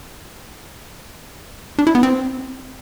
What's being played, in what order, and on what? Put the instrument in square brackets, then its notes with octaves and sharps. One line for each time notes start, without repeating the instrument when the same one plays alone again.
[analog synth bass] D4
E4
B3
C4